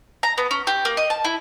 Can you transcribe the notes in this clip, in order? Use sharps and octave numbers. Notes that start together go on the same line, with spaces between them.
A#5
B3
C#4
G4
A#3
D#5
A5
E4